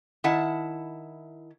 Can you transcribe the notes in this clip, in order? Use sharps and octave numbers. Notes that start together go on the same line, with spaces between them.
D#3 E4 F#5 A5